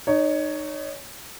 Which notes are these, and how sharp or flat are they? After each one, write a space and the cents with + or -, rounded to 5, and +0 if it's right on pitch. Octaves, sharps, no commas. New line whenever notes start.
D#4 -25 C#5 +10